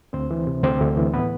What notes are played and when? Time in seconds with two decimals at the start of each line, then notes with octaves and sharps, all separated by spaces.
0.13 D2 C4 C5
0.31 E3
0.47 C3
0.63 D2 C4 C5
0.81 D2
0.97 E3
1.13 A2 B3 B4